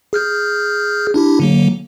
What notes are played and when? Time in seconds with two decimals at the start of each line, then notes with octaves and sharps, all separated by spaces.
0.13 G#4 F6 G6
1.14 D4 E4 G4
1.40 D3 F#3 A#3